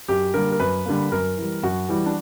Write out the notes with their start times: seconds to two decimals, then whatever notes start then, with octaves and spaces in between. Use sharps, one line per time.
0.08 F#2 G4
0.34 D3 G3 A#3 A#4
0.52 A#4
0.60 F#2 B4
0.86 D3 G3 A#3
1.12 F#2 A#4
1.37 E3 G3
1.63 F#2 F#4
1.89 E3 G3
2.06 D4